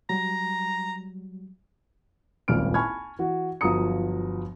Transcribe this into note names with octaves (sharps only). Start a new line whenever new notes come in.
F#3 G3 A#5
D#1 G#1 C#2 G3 F6 D7
G#5 A5 B5 C#6 F6 G#6
E3 F#4
G1 F3 F#3 A#5 D#6 C#7